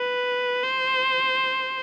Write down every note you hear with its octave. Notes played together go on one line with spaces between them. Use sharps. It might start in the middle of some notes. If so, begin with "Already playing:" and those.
Already playing: B4
C5